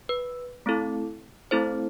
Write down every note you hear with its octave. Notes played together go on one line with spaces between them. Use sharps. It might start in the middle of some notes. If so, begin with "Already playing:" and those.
B4
A3 C4 E4 A4
A3 C4 E4 A4 C5